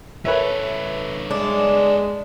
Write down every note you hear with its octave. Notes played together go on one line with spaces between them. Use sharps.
B3 A4 B4 C#5 E5
G#3 D4